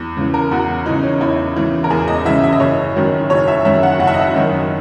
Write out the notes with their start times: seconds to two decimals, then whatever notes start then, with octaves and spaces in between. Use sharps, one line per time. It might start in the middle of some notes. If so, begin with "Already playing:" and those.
Already playing: E2
0.17 C#3 E3
0.34 A#4
0.51 E2 F#4
0.86 C#3 E3 D#4
1.03 C#4
1.21 E2 E4
1.56 C#3 E3
1.84 A#4
1.90 E2 G#4
2.08 D#5
2.25 C#3 E3 E5
2.43 E5
2.52 D#5
2.60 F#1 C#5
2.96 F#2 D#3 F#3
3.30 F#1 C#5
3.48 E5
3.65 F#2 D#3 F#3 E5
3.83 F#5
3.99 F#1 F#5
4.07 E5
4.14 D#5
4.21 E5
4.34 F#2 D#3 F#3